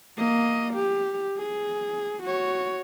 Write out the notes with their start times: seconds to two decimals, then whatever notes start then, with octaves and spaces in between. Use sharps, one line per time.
0.17 A#3 D#5
0.74 G4
1.38 G#4
2.23 F#4 C#5